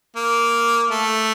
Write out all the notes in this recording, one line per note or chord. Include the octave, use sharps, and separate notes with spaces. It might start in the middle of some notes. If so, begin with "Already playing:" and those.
A#3
A3